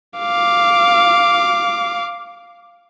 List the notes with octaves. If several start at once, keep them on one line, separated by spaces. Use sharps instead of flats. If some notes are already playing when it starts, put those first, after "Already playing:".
F5 D6